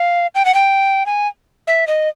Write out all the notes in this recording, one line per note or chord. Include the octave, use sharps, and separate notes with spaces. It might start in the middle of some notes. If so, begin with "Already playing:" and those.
Already playing: F5
G5
F#5
G5
G#5
E5
D#5